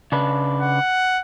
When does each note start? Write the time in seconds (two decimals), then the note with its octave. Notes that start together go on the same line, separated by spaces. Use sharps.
0.12 C#3 D4 B4
0.61 F#5